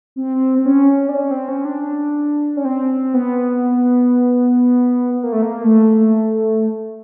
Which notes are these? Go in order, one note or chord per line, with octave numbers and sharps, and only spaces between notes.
C4
C4
C#4
D4
C#4
C4
C#4
D4
C#4
C4
B3
B3
A#3
A3
A#3
A3